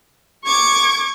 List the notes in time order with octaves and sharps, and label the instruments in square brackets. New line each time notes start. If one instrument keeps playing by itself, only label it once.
[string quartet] C#6 D6 G#6